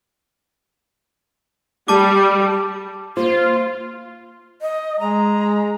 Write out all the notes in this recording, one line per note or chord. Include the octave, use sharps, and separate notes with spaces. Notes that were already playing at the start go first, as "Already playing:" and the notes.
G3 A5 D6
A#3 F4 C5
D#5
G#3 A#5